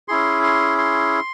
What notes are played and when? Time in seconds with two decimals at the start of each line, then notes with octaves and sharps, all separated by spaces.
0.08 C#4 E4 G#4 C6
0.43 C6
0.78 C6